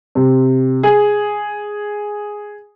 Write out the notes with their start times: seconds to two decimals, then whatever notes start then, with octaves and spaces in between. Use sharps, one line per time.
0.15 C3
0.83 G#4